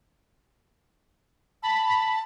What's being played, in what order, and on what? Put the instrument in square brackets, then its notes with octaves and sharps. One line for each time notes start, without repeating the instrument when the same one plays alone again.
[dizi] A5 [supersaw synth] B5